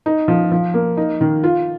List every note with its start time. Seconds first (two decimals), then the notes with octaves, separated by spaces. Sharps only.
0.06 D#4
0.28 F3
0.51 F3
0.74 A#3
0.97 D#4
1.21 D#3
1.44 F4